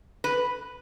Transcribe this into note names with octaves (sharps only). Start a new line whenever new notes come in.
B4